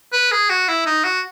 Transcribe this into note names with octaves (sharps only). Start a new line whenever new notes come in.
B4
G#4
F#4
E4
D#4
F#4